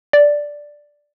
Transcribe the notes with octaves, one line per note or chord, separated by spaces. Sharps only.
D5